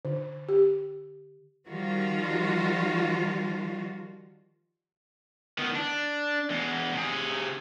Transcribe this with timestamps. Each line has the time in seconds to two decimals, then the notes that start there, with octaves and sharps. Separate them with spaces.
0.05 D3
0.49 G4
1.68 D#3 F3 G3 F4 F#4
5.58 D#3 B3
5.75 D4
6.50 E2 G#3
6.93 C3 G#4